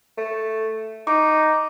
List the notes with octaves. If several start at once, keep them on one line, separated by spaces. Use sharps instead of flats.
A3
D#4 D6